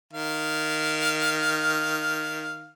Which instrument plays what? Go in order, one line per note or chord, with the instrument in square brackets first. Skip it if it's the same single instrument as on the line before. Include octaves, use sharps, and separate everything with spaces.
[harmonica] D#3 F5